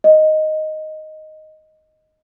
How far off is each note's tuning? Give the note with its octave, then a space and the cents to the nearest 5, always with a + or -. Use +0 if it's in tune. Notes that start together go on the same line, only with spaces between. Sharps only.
D#5 +0